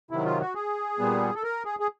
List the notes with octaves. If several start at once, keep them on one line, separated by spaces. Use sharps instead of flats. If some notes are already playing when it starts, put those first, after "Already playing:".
C3 D#3 F#3 E4
F4
F#4
G#4
A#2 G3 B3
A4
A#4
G#4
G#4